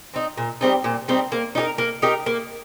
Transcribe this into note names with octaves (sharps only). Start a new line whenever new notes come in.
C4 D#4
A#2
G3 C4 D#4
A#2
G3 C4 D#4
A#3
D#4 G4 A#4
A#3
D#4 G4 A#4
A#3